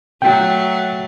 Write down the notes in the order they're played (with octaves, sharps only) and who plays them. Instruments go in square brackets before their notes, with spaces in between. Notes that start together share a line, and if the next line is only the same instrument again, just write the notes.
[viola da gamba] F#3 A3 [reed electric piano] G5